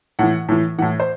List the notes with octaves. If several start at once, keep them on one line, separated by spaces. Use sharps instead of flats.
A2 E3 F#5
A2 E3
A2 E3 F#5
C5